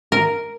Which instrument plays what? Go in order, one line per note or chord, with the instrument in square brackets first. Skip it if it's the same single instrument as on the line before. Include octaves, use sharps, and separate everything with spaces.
[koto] A#4